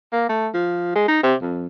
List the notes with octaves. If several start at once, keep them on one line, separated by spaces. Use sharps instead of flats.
A#3
A3
F3
G#3
D#4
C3
F2